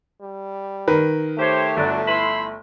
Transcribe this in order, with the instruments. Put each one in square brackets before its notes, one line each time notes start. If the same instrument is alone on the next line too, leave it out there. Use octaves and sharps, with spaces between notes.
[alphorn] G3
[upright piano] D#3 A#4 B4
[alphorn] A3 [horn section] G4 C5 C#5
[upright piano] G1 [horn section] F#3 D4
[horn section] E4 B5 C6